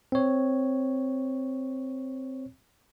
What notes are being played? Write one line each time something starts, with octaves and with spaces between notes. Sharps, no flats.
C4 C#5